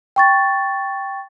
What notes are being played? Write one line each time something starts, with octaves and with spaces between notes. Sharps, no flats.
G5 C#6 A6